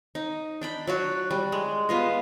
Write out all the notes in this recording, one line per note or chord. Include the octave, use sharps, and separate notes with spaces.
D#4
D4 G5 B5
F#3 D4 F#4
G3
G#3
B3 F4 D#5